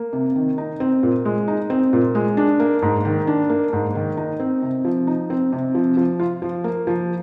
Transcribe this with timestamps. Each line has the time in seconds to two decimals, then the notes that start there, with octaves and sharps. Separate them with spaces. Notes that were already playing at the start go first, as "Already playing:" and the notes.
Already playing: A#3
0.13 C3
0.36 D#3
0.58 D#4
0.80 C4
1.03 A#2
1.25 G#3
1.48 D#4
1.70 C4
1.93 A#2
2.15 G#3
2.37 D4
2.60 A#3
2.82 G#2
3.05 D#3
3.27 D4
3.49 A#3
3.73 G#2
3.95 D#3
4.17 D#4
4.40 C4
4.62 C3
4.85 F3
5.07 D#4
5.30 C4
5.53 C3
5.75 F3
5.97 F3
6.20 F4
6.42 F3
6.64 A#3
6.87 F3